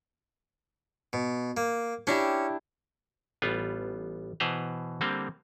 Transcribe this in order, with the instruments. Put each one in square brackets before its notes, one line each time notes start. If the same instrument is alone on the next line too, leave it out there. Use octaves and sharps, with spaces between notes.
[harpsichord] B2
A#3
[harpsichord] C#4 [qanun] D4 E4 G4
[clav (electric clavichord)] A1 G3 B3 F4
B2 E3 B4 C5 A#5
D3 G3 A#3 C4